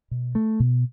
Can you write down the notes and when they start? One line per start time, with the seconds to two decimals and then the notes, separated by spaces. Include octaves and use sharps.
0.11 B2
0.35 A3
0.60 B2